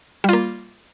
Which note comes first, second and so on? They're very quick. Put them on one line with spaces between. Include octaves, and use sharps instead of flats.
G3 F4 A#3